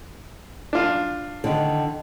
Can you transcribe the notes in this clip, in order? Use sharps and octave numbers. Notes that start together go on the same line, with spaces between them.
D4 F4
D3 D#3